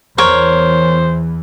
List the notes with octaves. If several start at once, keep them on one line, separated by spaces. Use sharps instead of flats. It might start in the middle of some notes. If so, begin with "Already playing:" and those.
E2 E3 A#4 C5 C#5